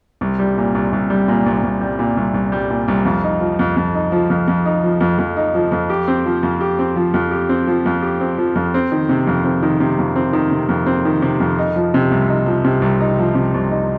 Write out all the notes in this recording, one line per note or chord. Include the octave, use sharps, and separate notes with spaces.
C2
G3
A#2
C2
C2
G3
A#2
C2
C2
G3
A#2
C2
C2
G3
A#2
C2
F2
D#4
F3
F2
F2
D#4
F3
F2
F2
D#4
F3
F2
F2
D#4
F3
F2
G4
C4
F3
F2
G4
C4
F3
F2
G4
C4
F3
F2
G4
C4
F3
F2
C4
D#3
C3
F2
C4
D#3
C3
F2
C4
D#3
C3
F2
C4
D#3
C3
F2
D#4
F3
C3
C2
D#4
F3
C3
C2
D#4
F3
C3
C2
D#4